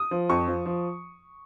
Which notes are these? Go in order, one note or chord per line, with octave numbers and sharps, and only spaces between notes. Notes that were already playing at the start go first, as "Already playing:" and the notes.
Already playing: D#6
F3
F2 C#6
F3
F3